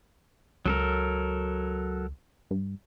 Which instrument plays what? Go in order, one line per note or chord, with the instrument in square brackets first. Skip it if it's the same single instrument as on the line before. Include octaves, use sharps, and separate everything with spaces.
[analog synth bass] C#2 [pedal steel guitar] F#3 A4 A#4
[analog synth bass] G2